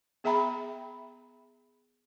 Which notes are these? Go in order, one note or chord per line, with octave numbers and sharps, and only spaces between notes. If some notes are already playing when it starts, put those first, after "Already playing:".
B3 G#4 E5 G5 A#5 B5